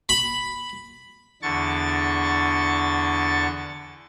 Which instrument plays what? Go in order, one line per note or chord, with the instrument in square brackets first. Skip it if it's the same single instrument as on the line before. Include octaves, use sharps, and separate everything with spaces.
[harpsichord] B5
[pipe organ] E2 D3 C#6 A6